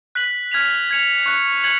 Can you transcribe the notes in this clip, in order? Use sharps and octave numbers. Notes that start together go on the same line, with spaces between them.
F#6 B6 F#7
F6 G#6 B6 F7
F6 G#6 C#7 F7
C#6 F#6 C#7
G#6 C#7 F#7